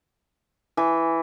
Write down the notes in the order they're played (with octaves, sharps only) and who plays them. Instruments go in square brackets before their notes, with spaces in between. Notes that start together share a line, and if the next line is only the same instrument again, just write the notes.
[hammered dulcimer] E3